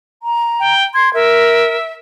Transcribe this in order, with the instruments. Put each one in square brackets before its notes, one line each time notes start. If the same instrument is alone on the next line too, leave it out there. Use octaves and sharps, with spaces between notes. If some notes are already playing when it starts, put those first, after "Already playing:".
[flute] A#5
[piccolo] G5
[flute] C6 [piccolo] G#6
[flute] A#4 [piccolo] E5